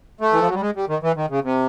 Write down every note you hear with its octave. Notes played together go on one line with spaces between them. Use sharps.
A3
E3
F3
F#3
G3
G#3
G3
D#3
E3
D#3
C#3
C3